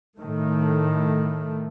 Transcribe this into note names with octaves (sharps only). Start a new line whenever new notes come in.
A2 D#3 A3